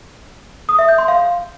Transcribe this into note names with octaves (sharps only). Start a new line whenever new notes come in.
D#6
E5
G6
C6
F5